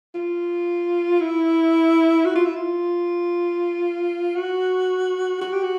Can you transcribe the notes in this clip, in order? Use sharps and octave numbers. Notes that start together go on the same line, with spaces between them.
F4
E4
F#4
F4
E4
F4
F#4
F#4
G4
F#4